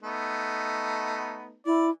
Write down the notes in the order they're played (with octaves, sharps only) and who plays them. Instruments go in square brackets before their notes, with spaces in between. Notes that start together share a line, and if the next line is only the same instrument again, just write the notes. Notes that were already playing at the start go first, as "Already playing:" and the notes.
[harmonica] A3 B3 D#4
[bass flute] E4 [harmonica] D5